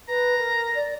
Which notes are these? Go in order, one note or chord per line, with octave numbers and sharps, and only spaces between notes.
B4 A#5
A#4
D5